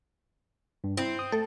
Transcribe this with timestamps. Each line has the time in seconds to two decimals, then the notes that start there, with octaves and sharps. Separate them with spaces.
0.84 G2
0.97 C4 E4
1.19 D#6
1.32 A3 A4